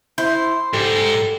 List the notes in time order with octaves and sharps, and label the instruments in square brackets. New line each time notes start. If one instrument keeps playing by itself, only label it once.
[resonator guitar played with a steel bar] E4 [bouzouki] C5
[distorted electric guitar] G#2 [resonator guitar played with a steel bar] G3 [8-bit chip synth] A4